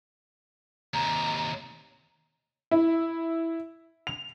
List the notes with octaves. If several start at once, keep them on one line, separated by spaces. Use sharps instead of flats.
D#2 C3 A#5
E4
F7